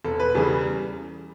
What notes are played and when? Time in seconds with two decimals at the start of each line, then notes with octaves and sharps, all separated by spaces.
0.05 E1 A4
0.20 B4
0.34 E2 C#3 E3 G3 A4